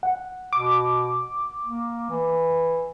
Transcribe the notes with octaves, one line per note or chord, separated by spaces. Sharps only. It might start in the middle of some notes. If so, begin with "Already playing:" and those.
F#5
B2 D6
A#3
E3